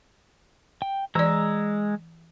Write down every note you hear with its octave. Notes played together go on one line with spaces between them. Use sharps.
G5
E3 G#3 D5 A#5 E6